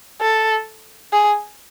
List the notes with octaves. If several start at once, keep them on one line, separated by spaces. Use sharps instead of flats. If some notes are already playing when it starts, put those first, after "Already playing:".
A4
G#4